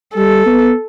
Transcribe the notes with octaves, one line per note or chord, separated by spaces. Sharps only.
G3 A4
B3